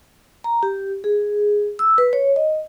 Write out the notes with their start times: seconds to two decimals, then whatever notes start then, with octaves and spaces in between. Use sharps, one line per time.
0.44 A#5
0.63 G4
1.04 G#4
1.79 E6
1.98 B4
2.13 C#5
2.36 D#5